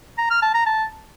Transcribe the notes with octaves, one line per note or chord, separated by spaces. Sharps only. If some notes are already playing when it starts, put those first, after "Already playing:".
A#5
F6
A5
A#5
A5